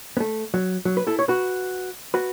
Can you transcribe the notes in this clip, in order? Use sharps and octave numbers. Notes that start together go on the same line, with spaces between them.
B3
A3
F#3
F#3
B4
E4 A4
C#5
F#4 B4
F#4 B4